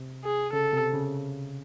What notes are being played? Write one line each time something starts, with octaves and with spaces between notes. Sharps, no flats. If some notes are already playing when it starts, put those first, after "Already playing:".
Already playing: C3
G#4
C#3 A4
C3
C#3